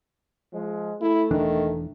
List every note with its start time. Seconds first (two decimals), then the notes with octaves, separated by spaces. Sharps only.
0.53 F3 G#3
1.02 A3 E4
1.31 E1 D#3 E3 D4